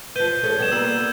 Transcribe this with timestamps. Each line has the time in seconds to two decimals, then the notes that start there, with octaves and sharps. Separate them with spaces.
0.16 F3 B4 G6 D#7 G7
0.43 C#4 G#4 A4
0.59 G3 B3 G#6 E7
0.71 G3 A#3 B3 E6